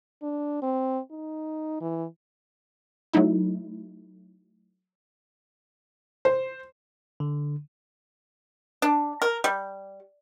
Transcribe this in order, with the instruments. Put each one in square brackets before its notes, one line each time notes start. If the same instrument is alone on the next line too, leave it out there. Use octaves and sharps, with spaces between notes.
[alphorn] D4
C4
D#4
E3
[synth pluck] F#3 A3 D#4 E4
[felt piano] C5
[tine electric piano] D3
[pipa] D4
A#4
G3